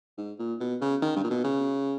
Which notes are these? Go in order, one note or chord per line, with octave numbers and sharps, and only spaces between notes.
G#2
A#2
B2
C#3
D#3
G2
A#2
B2
C#3